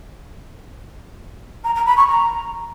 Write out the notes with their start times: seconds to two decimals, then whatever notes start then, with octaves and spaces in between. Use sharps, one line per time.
1.64 A#5
1.75 A#5
1.86 B5
1.97 C#6
2.08 A#5